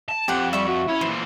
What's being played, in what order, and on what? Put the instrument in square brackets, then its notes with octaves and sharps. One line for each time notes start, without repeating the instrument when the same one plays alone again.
[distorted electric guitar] A5
[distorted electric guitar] F2 [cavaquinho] G4 C5 F#5
[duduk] G3 [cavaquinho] E5 C#6
[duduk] F#4
[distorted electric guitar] C#4 [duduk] E4
[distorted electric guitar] A#2 E3 [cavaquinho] C5